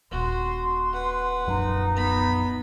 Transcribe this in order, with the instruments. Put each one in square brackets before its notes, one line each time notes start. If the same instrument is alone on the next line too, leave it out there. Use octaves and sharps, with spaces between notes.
[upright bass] D#1 A#2 [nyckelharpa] F#4 [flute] C6
[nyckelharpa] B4 F#5
[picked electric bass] A#1 F#2 F#3 [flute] D#4
[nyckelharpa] B3 B5